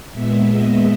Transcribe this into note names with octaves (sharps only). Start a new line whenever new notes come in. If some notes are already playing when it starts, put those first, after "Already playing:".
A#2 G#3 B3 E5
D#5